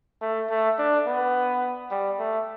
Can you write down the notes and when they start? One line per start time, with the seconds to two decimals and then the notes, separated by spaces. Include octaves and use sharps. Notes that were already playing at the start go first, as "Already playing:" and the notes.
0.21 A3
0.50 A3
0.78 D4
1.07 B3
1.91 G3
2.19 A3